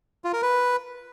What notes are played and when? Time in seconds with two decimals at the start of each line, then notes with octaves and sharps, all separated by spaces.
0.24 F4
0.33 A#4
0.42 B4